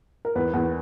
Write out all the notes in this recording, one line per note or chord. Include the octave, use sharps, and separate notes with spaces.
A#4
E2 B4
E2